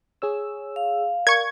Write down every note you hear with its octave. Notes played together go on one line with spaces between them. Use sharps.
G#4 C#5 E6
F5
A#4 D5 C#6 G#6